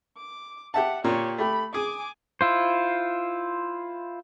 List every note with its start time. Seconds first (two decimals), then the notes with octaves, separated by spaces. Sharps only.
0.17 D6
0.74 G4 E5 F#5 A5
1.04 A#2 G4 C#5
1.38 A3 G4 B5
1.74 G#4 G#5 D6
2.41 E4 F4 C5